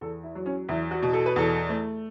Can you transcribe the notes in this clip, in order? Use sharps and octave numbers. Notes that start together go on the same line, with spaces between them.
E2 A4
E4
F#3
C#4
E2 E4
F#4
B2
A4
B4
E2 A4
A3